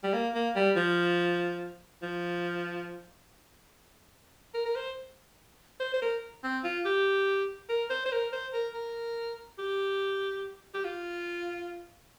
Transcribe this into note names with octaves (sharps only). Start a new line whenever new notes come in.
G3
A#3
A#3
G3
F3
F3
A#4
A#4
C5
C5
C5
A#4
C4
F4
G4
A#4
C5
C5
A#4
C5
A#4
A#4
G4
G4
F4